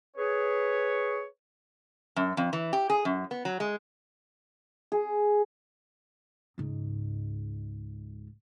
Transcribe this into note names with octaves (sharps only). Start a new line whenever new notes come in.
G#4 B4 C#5
F#2
F2
E3
G4
G#4
F#2
B3
F#3
G#3
G#4
C#2 G#2